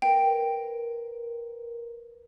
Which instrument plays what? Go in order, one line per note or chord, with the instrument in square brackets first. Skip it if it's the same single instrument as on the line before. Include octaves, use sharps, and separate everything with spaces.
[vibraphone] A#4 B4 [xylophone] G5